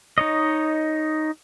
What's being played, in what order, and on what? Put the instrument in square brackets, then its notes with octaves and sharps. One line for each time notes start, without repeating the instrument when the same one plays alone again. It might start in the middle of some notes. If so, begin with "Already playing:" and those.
[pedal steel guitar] D#4 C#5 D#5